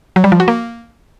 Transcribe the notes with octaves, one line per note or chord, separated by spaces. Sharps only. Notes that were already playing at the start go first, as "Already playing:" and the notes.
F#3
G3
F3
F#4
A#3